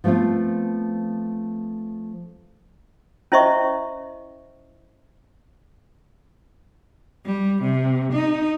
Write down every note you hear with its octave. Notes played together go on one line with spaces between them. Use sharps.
F3 A3 B3 C4 F4
C#4 E4 C5 D#5 E5 C#6
G3
C3
D#4